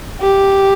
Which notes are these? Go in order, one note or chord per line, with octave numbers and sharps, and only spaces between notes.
G4